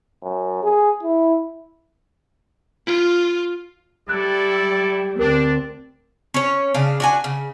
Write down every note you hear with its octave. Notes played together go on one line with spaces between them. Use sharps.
F#2
G#4
E4
F4
G3 E4 G4 A4 D5 F#6
D2 C4 D4 A#4
C#4 C#5
C#3 D4 F5
D4 F#4 G#5
C#3